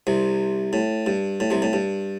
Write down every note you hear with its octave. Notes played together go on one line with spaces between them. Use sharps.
C2 C3
A2
G2
A2
C2 C3
A2
G2